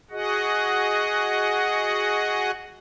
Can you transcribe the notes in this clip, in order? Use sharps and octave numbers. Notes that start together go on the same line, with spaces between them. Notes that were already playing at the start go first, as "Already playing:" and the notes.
F#4 G#4 D#5 F#5